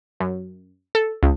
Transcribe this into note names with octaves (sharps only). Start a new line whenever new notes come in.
F#2
A4
C#2